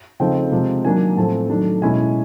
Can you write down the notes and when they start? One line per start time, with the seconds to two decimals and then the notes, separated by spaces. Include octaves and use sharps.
0.20 C#3 F3 A3 C4 D#4 G5
0.52 C3 F3 G#3
0.84 D#3 F#3 A#3 D4 G#5
1.16 A2 F3 A3 C4 A5
1.49 D#3 F#3 A3 D4
1.82 B2 G#3 C#4 E4 G#5